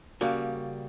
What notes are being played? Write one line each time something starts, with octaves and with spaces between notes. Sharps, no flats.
C#3 G3 A#3 F#4